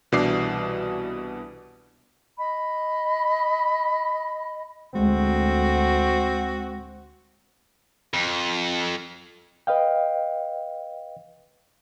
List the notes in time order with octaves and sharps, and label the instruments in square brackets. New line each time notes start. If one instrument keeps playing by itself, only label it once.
[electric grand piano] C2 B2 E3 D4 D6 C7
[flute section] D#5 B5
[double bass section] D2 [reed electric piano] G#3 [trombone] C4 [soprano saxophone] F#4
[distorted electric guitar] F2
[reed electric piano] B4 D#5 F5 G5